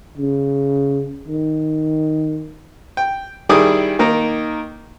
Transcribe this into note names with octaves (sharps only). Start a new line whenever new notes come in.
C#3
D#3
G5
D#3 G3 E4 G#4 D6 D#6
D#3 A#3 D#4